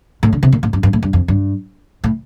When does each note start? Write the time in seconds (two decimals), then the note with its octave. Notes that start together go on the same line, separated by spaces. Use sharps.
0.23 A2
0.33 D3
0.43 C3
0.52 A#2
0.63 A2
0.73 G2
0.83 G2
0.93 A2
1.03 G2
1.13 F2
1.28 G2
2.04 A2